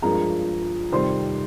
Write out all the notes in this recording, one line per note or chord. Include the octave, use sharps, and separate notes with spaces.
G2 F3 G#3 A#4 A#5
F2 C3 D#3 G3 C5 C6